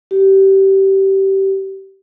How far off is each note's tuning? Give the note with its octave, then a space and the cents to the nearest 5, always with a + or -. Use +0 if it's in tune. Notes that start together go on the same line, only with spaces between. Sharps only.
G4 -20